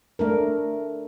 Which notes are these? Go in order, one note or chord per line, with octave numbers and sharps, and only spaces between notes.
A3 D4 A#4